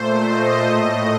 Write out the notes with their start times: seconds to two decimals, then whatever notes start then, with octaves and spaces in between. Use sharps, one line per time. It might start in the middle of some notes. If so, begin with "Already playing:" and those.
Already playing: A#2 A3 C5
0.26 D#5
0.66 A2 A3 D#5